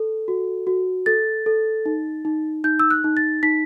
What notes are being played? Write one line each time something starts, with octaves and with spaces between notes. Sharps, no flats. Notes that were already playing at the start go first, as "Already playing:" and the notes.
Already playing: A4
F#4
F#4
A4 A6
A4
D#4
D#4
D#4 G6
E6
F#6
D#4
A6
D#4 B6